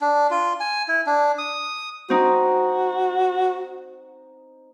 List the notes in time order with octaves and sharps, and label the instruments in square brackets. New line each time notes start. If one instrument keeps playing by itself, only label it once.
[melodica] D4
F4
G#5
E4
D4
D#6
[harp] C4 D#4 [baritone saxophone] F#4